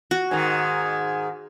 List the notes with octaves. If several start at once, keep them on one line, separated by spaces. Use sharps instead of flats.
F#4
G#2 D#3 G#5